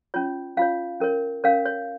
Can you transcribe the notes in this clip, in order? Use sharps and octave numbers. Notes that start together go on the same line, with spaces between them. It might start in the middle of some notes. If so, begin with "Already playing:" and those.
C#4 F4 C#5
C#4 F4 C#5 F5
C#4 A#4 C#5
C#4 A#4 C#5 F5
C#5